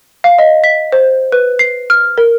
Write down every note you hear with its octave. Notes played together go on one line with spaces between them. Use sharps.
F5
D#5
B6
C5
B4
C7
F6
A#4